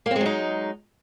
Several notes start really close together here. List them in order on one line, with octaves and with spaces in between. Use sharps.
A#3 C4 G#3 F#3 D#4